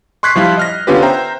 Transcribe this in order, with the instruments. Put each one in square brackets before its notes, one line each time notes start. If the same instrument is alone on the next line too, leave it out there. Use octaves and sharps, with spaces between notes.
[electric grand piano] C6 C#6 F#6 G#6 B6 C7
F3 G3 E4 F4
D#5 F6 A#6
D3 B3 C#4 F4 G4 B4
C5 E5 G5 A#5